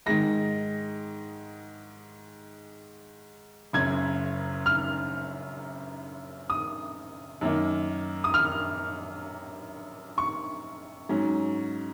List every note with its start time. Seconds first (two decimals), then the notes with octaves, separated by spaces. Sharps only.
0.06 G#2 D#3 G#3 D#4 A#6
3.73 F#1 F#2 C#3 G#6
4.66 F6
6.50 D#6
7.41 F#2 D#3 A#3 D#4
8.24 D#6
8.34 F6
10.18 C#6
11.09 G#2 F#3 C#4